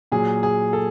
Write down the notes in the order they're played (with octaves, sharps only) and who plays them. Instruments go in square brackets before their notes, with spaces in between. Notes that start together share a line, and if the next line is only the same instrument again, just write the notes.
[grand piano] A#2 F#3 G#4
G#4
A4